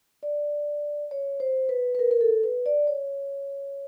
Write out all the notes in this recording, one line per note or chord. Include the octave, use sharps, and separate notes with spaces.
D5
C#5
C5
B4
B4
A#4
A#4
A4
B4
D5
C#5